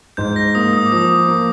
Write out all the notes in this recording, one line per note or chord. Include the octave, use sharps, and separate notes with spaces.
G#2 G6
A#6
A#3 D#6
D#6
D6
F3 D#6
A#3